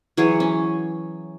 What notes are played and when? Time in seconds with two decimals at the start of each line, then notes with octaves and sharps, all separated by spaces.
0.17 E3 F#3 G#4 C#5
0.40 C#4